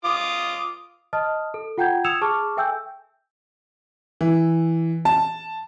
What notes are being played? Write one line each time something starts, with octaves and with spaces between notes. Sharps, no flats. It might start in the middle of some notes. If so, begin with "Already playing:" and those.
F4 D6 D#6
D#5 A5 D#6 F6
A4
F4 F#5 G5 A#5 G6 G#6
D#6 E6 G#6 C#7 E7 F7
G#4 A5 C#6 D6 F6
A4 E5 G5 G#5 E6 G6
E3
A5